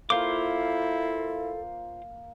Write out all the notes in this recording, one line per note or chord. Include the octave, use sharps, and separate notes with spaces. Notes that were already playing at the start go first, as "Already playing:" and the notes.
A#3 E4 F4 A4 C5 D6